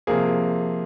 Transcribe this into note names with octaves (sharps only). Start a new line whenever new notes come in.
C3 F3 A#3 G#4